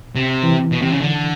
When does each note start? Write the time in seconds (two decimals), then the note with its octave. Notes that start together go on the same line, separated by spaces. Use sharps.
0.15 C3
0.43 E3
0.72 B2
0.82 C3
0.92 C#3
1.01 D3